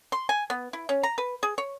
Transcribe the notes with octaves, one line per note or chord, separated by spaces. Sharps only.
C6
G#5
B3
E4
C#4
A#5
B4
G#4
C#5